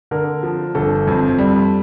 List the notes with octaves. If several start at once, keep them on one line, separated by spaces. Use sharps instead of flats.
D3 A#4
F3
G1 A4
F2
G3